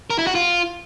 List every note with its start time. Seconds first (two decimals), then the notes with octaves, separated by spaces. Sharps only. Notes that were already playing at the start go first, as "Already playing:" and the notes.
0.10 A#4
0.19 E4
0.27 F#4
0.35 F4